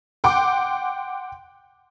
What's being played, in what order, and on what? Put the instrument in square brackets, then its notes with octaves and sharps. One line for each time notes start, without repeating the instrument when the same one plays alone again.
[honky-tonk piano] F#5 G5 C6 D6